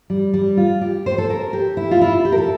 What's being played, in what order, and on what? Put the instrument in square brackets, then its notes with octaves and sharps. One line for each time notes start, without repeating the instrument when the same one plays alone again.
[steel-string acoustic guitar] G3
G3
F4
G4
C5
A4
A#4
G4
E4
F4
E4
G4
A#4
A4